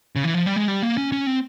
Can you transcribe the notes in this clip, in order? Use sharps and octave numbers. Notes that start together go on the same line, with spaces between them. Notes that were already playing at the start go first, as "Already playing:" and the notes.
C#3
E3
F3
G3
G#3
G3
A#3
C#4
C#4
C4